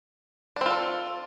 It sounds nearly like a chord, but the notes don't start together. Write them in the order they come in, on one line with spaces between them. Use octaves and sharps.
D4 C4 F4 A4